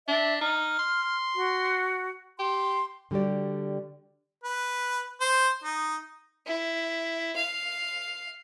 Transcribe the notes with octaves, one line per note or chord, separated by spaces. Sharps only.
D4 E5
D#4 F6
C6
F#4
G4 C6
D3 G3 F#4 G4 D5
B4
C5
D#4
E4
F5